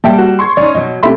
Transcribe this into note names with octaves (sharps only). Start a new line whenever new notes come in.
G3 A#3 E5 G5 A5
F#4
C6 C#6 G#6
C#4 D#4 D5
B2 F#3 D#5
C3 A3 G4 E5 B5 C6